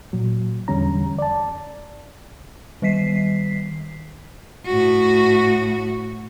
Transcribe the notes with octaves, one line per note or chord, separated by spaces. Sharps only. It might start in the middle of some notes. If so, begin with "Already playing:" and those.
A#2 F#3
E2 D3 G3 C#4 A#5
D5 A5
D#3 G3 B6 C7
A2 F#4